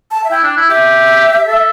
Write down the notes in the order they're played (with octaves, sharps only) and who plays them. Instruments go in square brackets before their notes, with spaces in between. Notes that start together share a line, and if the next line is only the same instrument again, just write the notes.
[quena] A5
E5
[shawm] E4 [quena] G5
[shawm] D4
E4
[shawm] G4 [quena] E5
[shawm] A4